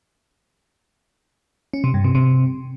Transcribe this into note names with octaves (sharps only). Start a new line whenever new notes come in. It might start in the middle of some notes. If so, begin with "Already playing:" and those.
C#4
C3
G2
C3
C3